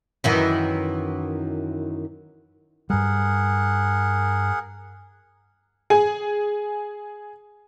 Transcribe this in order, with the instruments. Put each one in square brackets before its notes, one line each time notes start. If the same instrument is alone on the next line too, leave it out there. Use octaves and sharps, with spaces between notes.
[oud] F#2 D#3 E3
[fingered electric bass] G2 G3 [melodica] G#4 A#4 F#5
[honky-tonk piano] G#4 G#5